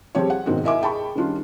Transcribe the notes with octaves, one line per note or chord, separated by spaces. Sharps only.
F3 G3 C4 G4 G#4 C#5
F#5
G#2 B2 D#3 G#3 C4 F#4
E4 A#4 D#5 E5 G#5 D6
G#4 G5 A5 B5 C#6
D#3 G3 C#4 D4 F4